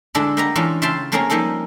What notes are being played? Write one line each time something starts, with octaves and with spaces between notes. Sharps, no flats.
D3 G#3 A3 D4 E4 A4
A#3 G4 B4 D#5 F#5 A#5
E3 G#3 A3 C#4 D4 F4
C#3 F4 E5 G5 A5 C6
A3 A#3 C4 C#4 G#4 A#4
F3 G3 A#3 D#4 A4